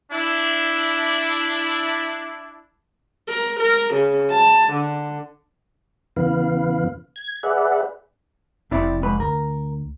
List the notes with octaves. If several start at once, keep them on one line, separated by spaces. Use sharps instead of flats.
D4 E4
A#4
A#4
C#3
A5
D3
E2 C#3 E3 B3 B4 F5
G#6
G#4 B4 D5 E5 F#5
F1 C3 E4 D5
G#2 B4
D2 A#4